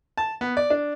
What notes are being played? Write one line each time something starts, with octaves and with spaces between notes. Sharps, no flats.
A5
B3
D5
D4